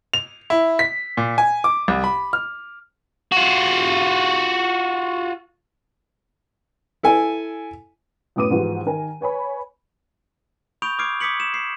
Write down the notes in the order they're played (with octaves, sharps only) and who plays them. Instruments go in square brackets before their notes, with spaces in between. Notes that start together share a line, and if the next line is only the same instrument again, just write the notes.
[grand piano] F7
E4
B6
A#2
G#5
D6
C2
B5
F6
[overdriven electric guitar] F4 F#4
[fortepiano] E4 A4 G#5
[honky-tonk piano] F#2 A2 B3 D6 D#6 D#7
G#2 E3 F3 B3 F#4 G4
D#3 A#4 G#5
B4 C#5 G#5 B5
[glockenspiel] B5 C#6 D#6 G6 D7 F7
D6 D#6 F6 G#6 C7 D7
D6 D#6 G#6 B6 C#7 F#7
E7
C7